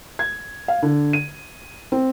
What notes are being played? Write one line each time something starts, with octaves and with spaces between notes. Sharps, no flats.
G#6
F5
D3
D#7
C4